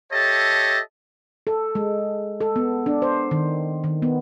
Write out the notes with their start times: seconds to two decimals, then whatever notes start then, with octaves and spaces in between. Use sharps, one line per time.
0.12 G4 A4 C#5 D#5 E5 A5
1.47 A4
1.75 G#3
2.41 A4
2.56 B3
2.86 D4
3.02 C5
3.31 D#3
3.84 D#3
4.02 B3